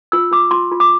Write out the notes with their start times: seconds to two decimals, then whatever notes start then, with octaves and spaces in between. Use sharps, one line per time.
0.12 F4 E6
0.31 F4 D6
0.51 F4 C6
0.71 F4
0.80 D6